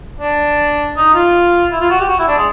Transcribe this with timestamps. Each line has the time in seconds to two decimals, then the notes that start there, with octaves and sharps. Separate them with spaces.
0.21 D4
0.97 D#4
1.15 F4
1.72 E4
1.81 F4
1.90 F#4
2.00 G4
2.09 F#4
2.19 E4
2.28 D4
2.37 G#3